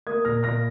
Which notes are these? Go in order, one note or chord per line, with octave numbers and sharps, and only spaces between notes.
A#3 D#6 G#6
A#2 F6 A#6
A#2 F6 A#6